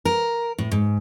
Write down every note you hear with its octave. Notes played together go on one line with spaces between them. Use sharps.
A#4
A2
G#2